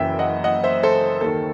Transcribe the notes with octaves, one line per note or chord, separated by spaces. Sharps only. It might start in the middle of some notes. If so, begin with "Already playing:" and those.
Already playing: F#1 F#2 E3 E5 G5
D#5 F#5
D#5 F#5
C5 E5
A4 C5
D#2 D#3 A4